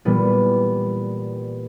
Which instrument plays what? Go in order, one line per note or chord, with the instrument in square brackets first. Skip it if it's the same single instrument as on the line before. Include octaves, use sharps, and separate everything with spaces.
[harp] A#2 E3 G3 B3